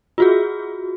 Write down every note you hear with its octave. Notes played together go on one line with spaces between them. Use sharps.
F4 F#4 G#4